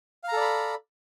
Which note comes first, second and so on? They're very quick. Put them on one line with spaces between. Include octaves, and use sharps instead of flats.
F5 A#5 A4 D5 B5